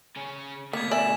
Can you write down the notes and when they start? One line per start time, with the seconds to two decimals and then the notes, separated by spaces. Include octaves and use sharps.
0.17 C#3 C#4
0.73 D2 B2 A#3 G#6 B6
0.91 D5 E5 G#5 E7